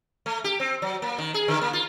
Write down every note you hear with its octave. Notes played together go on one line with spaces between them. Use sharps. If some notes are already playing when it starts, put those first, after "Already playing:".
A3
G4
C4
F#3
A#3
D#3
G#4
D3
A#3
F4